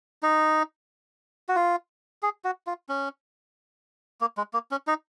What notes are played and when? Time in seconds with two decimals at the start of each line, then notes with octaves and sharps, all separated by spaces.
0.23 D#4
1.49 F#4
1.56 F4
2.23 G#4
2.44 F#4
2.67 F4
2.89 C#4
4.21 A#3
4.38 G#3
4.54 A#3
4.71 C#4
4.87 D#4